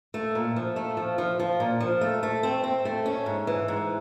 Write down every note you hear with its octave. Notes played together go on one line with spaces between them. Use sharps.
A3
A#2
F3
A3
F3
F3
F3
A#2
F3
A3
A3
C4
C4
A3
C#4
G#2
E3
G#2